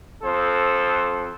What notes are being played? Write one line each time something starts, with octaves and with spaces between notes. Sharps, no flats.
F2 A4 C5